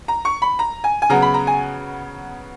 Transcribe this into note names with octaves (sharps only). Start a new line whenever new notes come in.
A#5
C#6
B5
A#5
G#5
G#5
C#3 F#3 B3 A#5
B5
A#5
G#5